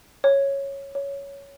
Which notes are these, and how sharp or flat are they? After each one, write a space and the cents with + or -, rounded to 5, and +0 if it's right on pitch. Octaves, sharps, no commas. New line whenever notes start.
C#5 -5
C#5 +10